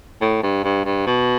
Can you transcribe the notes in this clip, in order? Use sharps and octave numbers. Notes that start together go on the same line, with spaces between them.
A2
G2
G2
G2
B2